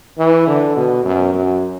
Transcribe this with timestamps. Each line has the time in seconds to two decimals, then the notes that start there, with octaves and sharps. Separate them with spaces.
0.18 E3
0.47 D3
0.77 B2
1.05 F#2
1.34 F#2